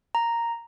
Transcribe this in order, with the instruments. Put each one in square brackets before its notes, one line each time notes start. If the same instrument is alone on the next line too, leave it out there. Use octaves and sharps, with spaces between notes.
[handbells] A#5